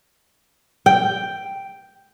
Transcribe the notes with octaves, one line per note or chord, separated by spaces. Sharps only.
G5